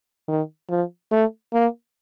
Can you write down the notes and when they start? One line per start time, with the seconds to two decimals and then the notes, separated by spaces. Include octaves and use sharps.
0.28 D#3
0.69 F3
1.11 A3
1.53 A#3